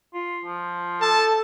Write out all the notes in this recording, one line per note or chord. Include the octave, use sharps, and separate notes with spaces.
F4
F3
A4 A5